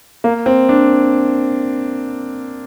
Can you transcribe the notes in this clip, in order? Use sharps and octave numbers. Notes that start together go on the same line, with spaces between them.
A#3
C4
D4